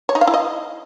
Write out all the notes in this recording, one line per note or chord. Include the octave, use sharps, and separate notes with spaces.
C#5
D#4
F5
E4
D#5